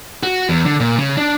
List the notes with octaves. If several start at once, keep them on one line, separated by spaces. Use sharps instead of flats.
F#4
E2
D3
A#2
C#3
D4